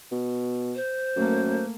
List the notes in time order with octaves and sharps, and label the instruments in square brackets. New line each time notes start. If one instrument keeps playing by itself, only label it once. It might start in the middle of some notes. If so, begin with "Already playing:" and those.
[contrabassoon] B2
[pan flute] C5
[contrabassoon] F#2 [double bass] A3 A#3